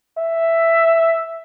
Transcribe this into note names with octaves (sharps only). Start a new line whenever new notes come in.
E5